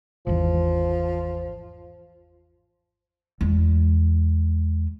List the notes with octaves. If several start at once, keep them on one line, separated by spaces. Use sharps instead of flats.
G#1 E2 F3
E2 G#3